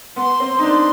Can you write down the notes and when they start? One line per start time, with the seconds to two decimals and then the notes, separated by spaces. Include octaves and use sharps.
0.16 B3 C6
0.40 C4
0.59 D#4
0.63 D4